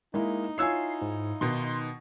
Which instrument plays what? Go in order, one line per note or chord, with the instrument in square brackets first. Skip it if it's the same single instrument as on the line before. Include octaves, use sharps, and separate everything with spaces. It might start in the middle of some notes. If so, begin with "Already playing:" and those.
[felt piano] G#3 A#3 E4 [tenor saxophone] D#4
[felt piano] E4 F4 G#5 [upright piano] C#5 E6 G#6 [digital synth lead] C7
[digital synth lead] G#2
[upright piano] B2 D#3 [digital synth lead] C6